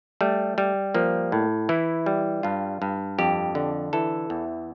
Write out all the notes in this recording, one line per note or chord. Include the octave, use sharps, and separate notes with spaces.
G3 A3
G3
F3 A#3
A2
E3 E4
G3
G2 F4
G2
F2 G4
D3
E3 A4
E2